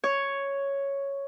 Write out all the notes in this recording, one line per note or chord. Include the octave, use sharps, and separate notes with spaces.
C#5